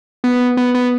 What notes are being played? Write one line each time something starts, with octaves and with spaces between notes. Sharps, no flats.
B3
B3
B3